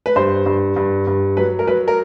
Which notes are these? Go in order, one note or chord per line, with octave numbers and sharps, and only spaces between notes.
B4
G2 C5
G2
G2
G2
F#3 B4
A#4
F#3 B4
A#4